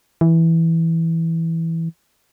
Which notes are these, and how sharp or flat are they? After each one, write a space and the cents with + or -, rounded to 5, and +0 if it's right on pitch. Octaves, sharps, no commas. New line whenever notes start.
E3 -5